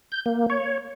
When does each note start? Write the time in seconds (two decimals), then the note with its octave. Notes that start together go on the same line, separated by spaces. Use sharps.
0.12 G6
0.26 A#3
0.50 C#5